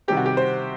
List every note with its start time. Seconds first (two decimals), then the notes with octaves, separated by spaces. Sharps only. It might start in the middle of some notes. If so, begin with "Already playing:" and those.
0.08 C3 D#3 G3 C4 G4
0.17 F#4
0.26 G4
0.37 C5